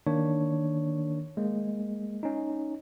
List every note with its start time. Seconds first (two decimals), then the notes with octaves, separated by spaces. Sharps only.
0.07 D#3 A#3 D4 C#5
1.37 G#3 A#3
2.23 C#4 D#4